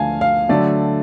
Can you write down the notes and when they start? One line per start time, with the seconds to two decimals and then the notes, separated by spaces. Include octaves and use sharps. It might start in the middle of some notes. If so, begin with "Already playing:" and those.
Already playing: D2 D3 F3 A3 F5 G#5 A5
0.21 F5
0.49 D3 F#3 A3 D5